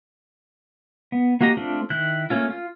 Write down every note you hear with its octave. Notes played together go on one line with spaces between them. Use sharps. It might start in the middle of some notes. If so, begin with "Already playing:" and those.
B3
A#3 F#4 G4 D#5 A#5
A3 C4 D4 F4
D#3 E4 F#6 G6
A3 A#3 C#4 F4
F4